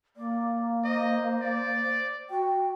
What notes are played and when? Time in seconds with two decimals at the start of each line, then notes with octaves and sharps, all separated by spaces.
0.16 A#3 D5
0.84 C5 D#5
1.41 D5
2.30 F#4 G5